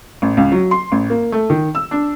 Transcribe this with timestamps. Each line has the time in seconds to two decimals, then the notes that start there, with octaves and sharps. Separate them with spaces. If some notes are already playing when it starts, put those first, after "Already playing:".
0.22 A1
0.37 C#2
0.52 F#3
0.71 C6
0.92 A1
1.10 A#3
1.32 A3
1.50 D#3
1.75 E6
1.91 D4